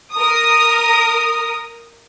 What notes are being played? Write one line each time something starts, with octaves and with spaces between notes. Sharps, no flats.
A#4 D#6